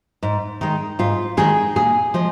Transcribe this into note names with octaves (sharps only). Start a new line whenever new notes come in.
G#2
D#3 G#3
G#2 F4
D#3 G#3 G#4
A#2 G#4
F3 G#3